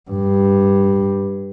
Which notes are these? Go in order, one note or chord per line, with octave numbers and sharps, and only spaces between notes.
G2